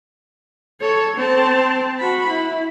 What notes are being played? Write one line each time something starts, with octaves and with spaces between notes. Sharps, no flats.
A4 C#5
C4 A5
F#4 B5
E4